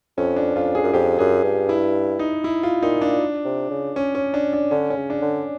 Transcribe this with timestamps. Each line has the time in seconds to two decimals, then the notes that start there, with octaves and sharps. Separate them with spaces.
0.17 F2 C#4
0.36 D4
0.55 F2 F4
0.75 G#4
0.83 F#2
0.93 F2 G4
1.19 F#2 G#4
1.44 G2
1.69 E4
2.19 D#4
2.44 E4
2.63 F4
2.82 A#2 D#4
3.02 D4
3.45 C3
3.70 C#3
3.96 C#4
4.15 C#4
4.34 D4
4.53 D4
4.71 D3 C#4
4.90 C#4
4.96 C#3
5.10 D4
5.22 D3